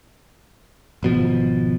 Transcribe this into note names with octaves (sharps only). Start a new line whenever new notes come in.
G#1 B2 F3